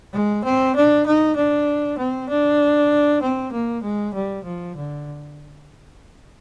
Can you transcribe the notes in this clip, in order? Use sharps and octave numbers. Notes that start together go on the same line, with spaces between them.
G#3
C4
D4
D#4
D4
C4
D4
C4
A#3
G#3
G3
F3
D3